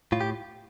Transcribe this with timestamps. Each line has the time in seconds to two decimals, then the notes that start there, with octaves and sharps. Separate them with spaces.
0.12 A2 F4
0.21 G4